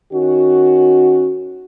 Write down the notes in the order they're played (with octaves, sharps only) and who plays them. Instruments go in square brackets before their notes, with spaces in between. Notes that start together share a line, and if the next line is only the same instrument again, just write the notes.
[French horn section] D#3 C#4 F#4